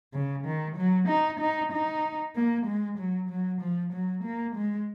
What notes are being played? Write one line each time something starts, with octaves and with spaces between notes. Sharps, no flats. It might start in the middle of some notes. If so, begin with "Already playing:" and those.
C#3
D#3
F#3
D#4
D#4
D#4
A#3
G#3
F#3
F#3
F3
F#3
A#3
G#3